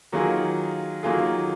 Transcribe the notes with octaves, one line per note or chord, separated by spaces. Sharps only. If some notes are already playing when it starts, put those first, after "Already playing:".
D#3 F#3 A#3 F4 G#4
D#3 F#3 A#3 F4 G#4